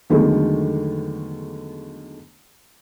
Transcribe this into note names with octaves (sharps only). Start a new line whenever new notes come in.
E2 D3 D#3 F#3 G#3 A3